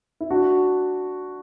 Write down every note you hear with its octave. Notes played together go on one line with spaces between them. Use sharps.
E4
D4 F#4